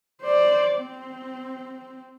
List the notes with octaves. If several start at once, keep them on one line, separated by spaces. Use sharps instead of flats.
C5 D5
C4